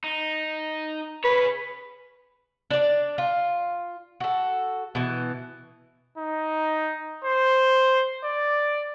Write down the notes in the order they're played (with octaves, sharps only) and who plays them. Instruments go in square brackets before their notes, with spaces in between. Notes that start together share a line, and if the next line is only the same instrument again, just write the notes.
[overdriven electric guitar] D#4
[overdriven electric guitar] G#4 C#5 [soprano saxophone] B4
[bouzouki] D4 D5
F4
F#4 A4
B2 E3
[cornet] D#4
C5
D5